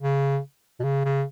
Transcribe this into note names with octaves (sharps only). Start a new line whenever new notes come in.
C#3
B2
C#3
C#3